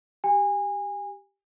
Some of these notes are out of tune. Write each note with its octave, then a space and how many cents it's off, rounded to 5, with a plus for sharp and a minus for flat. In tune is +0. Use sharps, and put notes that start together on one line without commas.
G4 +0 G#5 -25